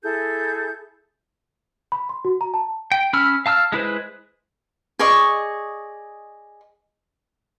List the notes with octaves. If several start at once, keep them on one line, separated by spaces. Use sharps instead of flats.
E4 G#4 A4 G6
B5
C6
F#4
A#5
A5
G5
C#4 B5 E6 F6
F5 A5 E6 F6
G#3 E4 B4 C5
G#4 D5 D#5 C#6